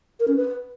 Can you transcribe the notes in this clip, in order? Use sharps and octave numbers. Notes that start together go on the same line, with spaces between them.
A#4
C#4
B4